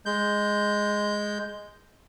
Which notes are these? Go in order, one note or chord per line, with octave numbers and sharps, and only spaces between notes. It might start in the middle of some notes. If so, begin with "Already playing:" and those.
G#3 G6